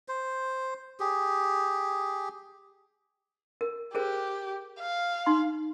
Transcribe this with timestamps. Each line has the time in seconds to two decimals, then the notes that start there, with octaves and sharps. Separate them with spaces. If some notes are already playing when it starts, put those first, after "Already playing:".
0.08 C5
1.00 G4 G#4
3.61 A#4
3.95 G4 G#4 A#4 C5
4.80 F5
5.26 D#4 C6